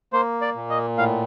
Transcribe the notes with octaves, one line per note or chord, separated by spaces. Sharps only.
A#3 C5
D5
A#2
D#5
A2 F5